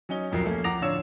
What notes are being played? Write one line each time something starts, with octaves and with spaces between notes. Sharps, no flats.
F#3 C#4 D#4 G7
D#1 A#1 F2 F#3 A#4 C7
A3 A#3 C#4
F2 F#5 A#5 D6 A#6 F7
D1 D4 F4 C#5 E6 E7